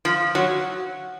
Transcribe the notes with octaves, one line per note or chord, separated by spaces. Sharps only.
F3
F#3